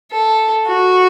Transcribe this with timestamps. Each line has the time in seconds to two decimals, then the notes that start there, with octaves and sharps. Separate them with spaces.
0.11 A4
0.67 F#4